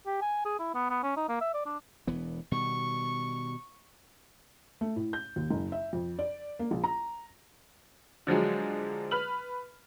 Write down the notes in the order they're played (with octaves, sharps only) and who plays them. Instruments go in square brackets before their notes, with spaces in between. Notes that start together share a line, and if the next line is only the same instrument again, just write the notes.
[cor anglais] G4
G#5
G#4
E4
B3
B3
C#4
D#4
A#3
E5
D5
D4
[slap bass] E1 E3 B3
[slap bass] B2 D#3 G3 [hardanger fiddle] C#6
[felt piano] A3
A2
G6
D#2
F#1
E5
F2
D5
A#3
A#1
A#5
[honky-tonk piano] D3 F3 F#3 G#3
B4 F6 F#7